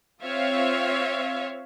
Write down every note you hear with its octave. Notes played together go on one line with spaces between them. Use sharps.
C4 F4 C#5 E5 F5